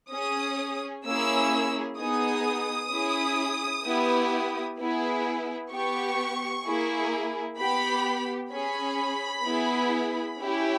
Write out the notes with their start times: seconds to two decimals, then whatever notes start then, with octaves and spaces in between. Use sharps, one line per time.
0.12 C#4 G#4 D#6
1.05 A#3 C#4 E4 G#4 E6
1.98 B3 D#4 G#4 D#6
2.92 C#4 E4 G#4
3.85 B3 E4 G4
4.79 B3 E4 G#4
5.71 B3 G4 C#6
6.65 A#3 E4 G#4
7.58 B3 G4 B5
8.52 C#4 G#4 B5
9.45 B3 E4 G#4
10.38 C#4 E4 G4